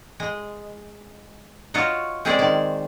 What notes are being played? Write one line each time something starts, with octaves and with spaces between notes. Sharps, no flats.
G#3 D#5
F4 F#4 C#5 D#5
G#3 C4 C#4 G#4 C5 D5
D#3 D5